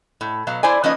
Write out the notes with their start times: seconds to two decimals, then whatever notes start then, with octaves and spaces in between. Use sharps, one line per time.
0.21 A2
0.47 B2 F#3 F5
0.63 E4 C5 D5 G#5
0.84 F3 A#3 C#4 D#4 B4 D#5